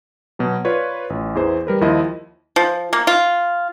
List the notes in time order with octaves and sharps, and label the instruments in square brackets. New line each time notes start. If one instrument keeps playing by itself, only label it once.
[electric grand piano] B2 F#3
F4 B4 C#5 D5
A1
E2 E3 G#4 C5
G3 A#4 B4
D#2 F3 E4 D#5 C6
[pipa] F3
A#3
F4